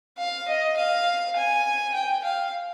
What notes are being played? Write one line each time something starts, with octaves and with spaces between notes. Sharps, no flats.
F5
D#5
F5
G#5
G5
F5